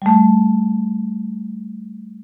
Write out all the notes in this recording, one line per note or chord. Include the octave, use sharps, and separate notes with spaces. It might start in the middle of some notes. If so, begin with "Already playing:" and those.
G3 A3